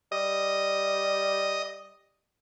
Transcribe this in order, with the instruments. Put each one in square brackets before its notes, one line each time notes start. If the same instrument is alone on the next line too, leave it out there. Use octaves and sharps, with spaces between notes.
[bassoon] G3 [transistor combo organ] D#5